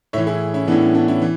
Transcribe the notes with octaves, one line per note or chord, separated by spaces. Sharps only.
A2 E3 C#5 E5
E4 G#4
C#4 E4
A2 E3 B3 D4
C#4
B3 D4
C#4 E4
E3